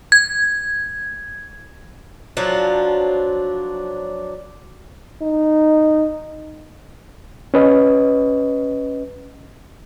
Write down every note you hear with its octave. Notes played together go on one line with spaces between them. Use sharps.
G#6
F3 F#3 D4
D#4
C#4 B4 D#5